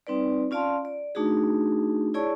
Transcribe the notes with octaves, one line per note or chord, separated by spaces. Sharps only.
G3 C4 D#4 B4 D5
C#4 F4 D5 F5 A5 C6
D5
A3 D4 D#4 F#4 G#4
E4 G#4 C#5 D5 A5 C#6